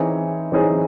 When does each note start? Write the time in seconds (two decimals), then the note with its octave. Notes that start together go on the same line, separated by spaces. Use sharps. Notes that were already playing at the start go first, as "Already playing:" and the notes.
Already playing: E3 C4 D#4 G#4 C#5
0.52 E3 C4 D#4 G#4 C#5